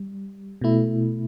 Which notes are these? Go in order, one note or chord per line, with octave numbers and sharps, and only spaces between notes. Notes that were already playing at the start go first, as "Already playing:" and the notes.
Already playing: G3
B2 A3 E4